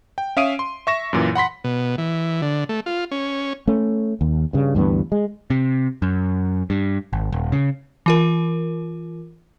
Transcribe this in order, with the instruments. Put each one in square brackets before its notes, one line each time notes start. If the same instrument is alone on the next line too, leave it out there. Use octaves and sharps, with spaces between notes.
[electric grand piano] G5
C#4 E5 F5 D#6 D7 D#7
C6
E5 C#6 A#6 E7
F#2 A#2 E3
F#5 B5 C6 B6
[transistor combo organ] B2
E3
D3
A3
F4
C#4
[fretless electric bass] A3 C#4
D#2
G2 C#3
D2 G2 E3 B3
G#3
[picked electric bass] C3
F#2
G2
G#1
D#1
C#3
[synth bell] E3 F4 A#4